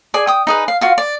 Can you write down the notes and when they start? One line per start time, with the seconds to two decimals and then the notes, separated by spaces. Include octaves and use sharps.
0.14 G#4 D5 G#5
0.27 G5 D#6
0.47 D#4 G#4 B4
0.68 F5
0.81 F4 F#4 F5
0.98 D5